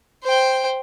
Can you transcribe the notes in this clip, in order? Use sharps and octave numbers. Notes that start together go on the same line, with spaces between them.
C5 G5